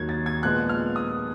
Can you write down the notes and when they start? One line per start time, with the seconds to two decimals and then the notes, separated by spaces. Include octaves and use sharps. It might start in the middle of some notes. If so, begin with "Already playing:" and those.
Already playing: D#2 D#3 F#3 G#6
0.09 A6
0.26 G#6
0.43 A#2 F3 G#3 B3 F#6
0.69 F6
0.96 D#6